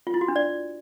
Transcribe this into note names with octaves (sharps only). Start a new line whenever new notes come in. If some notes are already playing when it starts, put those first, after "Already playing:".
F4
E4
F#4
D4
D5